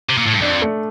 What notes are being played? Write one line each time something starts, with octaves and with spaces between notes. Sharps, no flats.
C3
A#2
A2
G2
F2 D4
A3